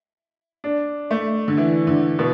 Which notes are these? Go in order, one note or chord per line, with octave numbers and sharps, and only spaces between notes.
D4
A3
D3
E3
D3
B2